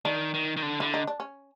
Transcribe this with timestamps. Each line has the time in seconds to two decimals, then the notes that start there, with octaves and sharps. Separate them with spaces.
0.05 D#3 D4
0.34 D#3
0.57 D#3
0.62 D3
0.80 D3 E4
0.94 D#4
1.07 D4
1.20 C#4